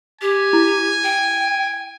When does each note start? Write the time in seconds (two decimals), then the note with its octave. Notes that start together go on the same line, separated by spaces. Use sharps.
0.22 G4 G#5
0.53 E4
1.04 G5